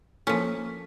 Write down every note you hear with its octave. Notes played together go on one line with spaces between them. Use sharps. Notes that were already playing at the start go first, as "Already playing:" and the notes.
F3 A#3 C#4 A4 B6